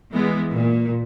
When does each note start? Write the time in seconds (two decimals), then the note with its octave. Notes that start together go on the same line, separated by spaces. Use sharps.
0.12 E3 G#3 B3
0.51 A#2